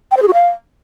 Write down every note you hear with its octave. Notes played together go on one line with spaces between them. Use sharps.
G5
C5
G#4
F#4
F5